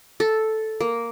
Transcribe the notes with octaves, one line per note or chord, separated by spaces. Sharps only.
A4
A#3